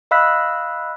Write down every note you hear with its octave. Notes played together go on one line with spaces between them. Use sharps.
D#5 F5 B5 E6 F#6 B6